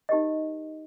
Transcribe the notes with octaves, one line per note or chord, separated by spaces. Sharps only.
D#4 G4 A#4 D#5